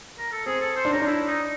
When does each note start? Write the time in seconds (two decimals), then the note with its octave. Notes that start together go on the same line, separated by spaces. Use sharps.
0.18 A#4
0.32 A4
0.46 C4 G#4
0.61 A4
0.76 C5
0.85 D4
0.92 C#4 A#4
1.02 D4 E4
1.27 D#4